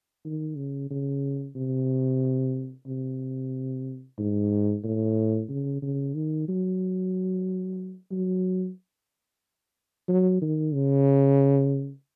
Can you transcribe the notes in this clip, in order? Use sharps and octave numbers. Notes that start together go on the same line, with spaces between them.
D#3
C#3
C#3
C3
C3
G#2
A2
C#3
C#3
D#3
F#3
F#3
F#3
D#3
C#3